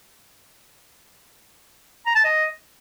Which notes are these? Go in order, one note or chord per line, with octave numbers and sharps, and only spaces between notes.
A#5
A5
D#5